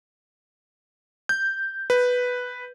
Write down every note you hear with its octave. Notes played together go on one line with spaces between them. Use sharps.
G6
B4